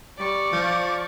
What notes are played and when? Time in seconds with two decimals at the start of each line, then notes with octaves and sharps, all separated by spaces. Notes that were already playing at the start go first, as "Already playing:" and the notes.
0.20 G3 D5 C#6
0.52 F3